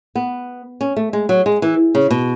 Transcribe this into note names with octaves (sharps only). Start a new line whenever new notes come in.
B3
C#4
A3
G#3
F#3
G#3
E3
C#3
B2